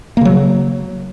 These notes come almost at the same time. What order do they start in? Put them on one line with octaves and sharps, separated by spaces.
A#3 C#3 F#3